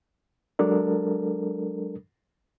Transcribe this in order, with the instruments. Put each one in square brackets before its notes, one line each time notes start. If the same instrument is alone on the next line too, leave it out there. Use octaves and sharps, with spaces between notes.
[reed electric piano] F#3 G#3 D4 A4 A#4